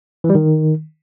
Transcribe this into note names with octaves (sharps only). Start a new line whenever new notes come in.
E3
G3
D#3